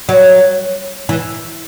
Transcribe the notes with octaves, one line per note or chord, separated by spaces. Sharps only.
F#3
E3